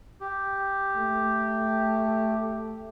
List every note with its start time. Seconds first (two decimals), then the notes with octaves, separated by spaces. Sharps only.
0.20 G4
0.95 A3